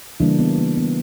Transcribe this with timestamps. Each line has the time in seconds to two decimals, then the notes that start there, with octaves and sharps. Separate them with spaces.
0.20 C#3 E3 G3 A#3 D4 E4
0.39 B3
0.57 A#3
0.77 B3